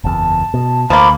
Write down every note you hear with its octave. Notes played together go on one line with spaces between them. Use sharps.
F#1 E2 A5
B2
D2 F3 A#3 B5